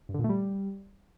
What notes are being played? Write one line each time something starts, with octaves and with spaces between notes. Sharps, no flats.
G2
D3
A#2
A3
G3